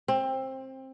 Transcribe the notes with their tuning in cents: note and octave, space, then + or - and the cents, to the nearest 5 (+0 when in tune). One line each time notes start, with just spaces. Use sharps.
C4 +20